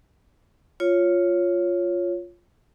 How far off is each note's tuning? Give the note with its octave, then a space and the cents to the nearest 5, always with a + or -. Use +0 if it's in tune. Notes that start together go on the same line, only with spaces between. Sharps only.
F4 +0 C#5 +0